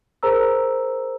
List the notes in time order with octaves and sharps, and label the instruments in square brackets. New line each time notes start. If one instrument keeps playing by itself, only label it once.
[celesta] G#4 A#4 C5 A#5 E6